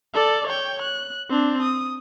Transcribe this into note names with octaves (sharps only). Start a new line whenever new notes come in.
A4 D5
C#5 G5
F#6
C4 D4
D#6